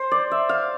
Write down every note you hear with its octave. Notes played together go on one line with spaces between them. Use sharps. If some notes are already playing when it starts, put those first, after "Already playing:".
Already playing: C5
D5
E5
F5